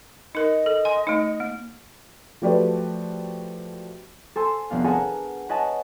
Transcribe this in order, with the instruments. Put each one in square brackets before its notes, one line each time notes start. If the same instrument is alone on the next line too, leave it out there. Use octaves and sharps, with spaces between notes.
[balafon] D#4 A#4 [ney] D#5
[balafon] A4
G#5 C6
A3 D#4
A#3
[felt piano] F3 A3 F#4 G4 B4 D5
[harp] A4 C5 G#5 C6 E6
F1 B3 D4 F5
G#4 A#4 B4 F#5 G#5 A5
B4 C#5 D#5 F#5 G#5 A5